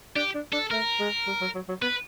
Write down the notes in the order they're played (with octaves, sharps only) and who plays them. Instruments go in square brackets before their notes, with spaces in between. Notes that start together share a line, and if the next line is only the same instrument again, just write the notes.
[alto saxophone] D4 [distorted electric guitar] G4
[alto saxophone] D4
[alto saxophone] D4 [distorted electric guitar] A4
[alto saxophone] A3 [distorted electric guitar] A#4
[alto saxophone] G#3
G3
F#3
F#3
F#3
[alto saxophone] B3 [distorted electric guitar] B4